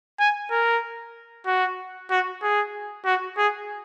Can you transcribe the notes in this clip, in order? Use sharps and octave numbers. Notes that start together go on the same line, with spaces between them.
G#5
A#4
F#4
F#4
G#4
F#4
G#4